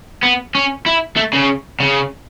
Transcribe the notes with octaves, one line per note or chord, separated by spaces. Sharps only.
B3
C#4
E4
A3
C#3
C#3